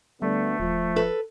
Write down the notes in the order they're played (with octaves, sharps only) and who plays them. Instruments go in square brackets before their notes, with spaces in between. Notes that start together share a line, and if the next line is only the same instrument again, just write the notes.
[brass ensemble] D2 D3 B3 [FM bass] G3 [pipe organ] A3
[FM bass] D#1 [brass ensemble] F3
[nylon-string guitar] A4 B4